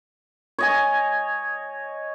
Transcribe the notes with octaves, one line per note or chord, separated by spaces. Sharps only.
C#5 D#5 G#5